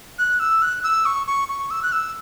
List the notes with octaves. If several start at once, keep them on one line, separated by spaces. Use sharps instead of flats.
F#6
E6
F#6
E6
C#6
C#6
C#6
E6
F#6
E6